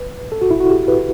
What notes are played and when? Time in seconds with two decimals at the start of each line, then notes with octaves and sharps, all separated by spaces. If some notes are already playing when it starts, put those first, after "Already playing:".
Already playing: B4
0.32 A4
0.41 F#4
0.51 E4
0.60 F#4
0.70 G4
0.88 B4